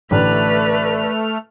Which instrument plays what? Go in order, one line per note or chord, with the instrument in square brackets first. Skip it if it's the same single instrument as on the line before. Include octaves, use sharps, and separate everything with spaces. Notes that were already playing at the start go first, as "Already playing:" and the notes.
[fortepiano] A1 D3 [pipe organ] A3 F6 [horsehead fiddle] B4 [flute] D5